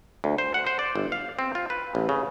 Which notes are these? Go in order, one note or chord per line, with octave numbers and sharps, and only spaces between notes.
D2
C5
F#5
C5
D5
G1
F5
C4
F4
B4
A1
C#3